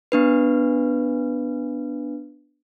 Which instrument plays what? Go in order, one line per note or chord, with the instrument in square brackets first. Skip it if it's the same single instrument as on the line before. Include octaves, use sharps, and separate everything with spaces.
[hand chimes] B3 D4 B4